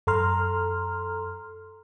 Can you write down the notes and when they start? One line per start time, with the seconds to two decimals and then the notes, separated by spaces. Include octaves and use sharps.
0.07 F#2 A4 A#5 C6 F6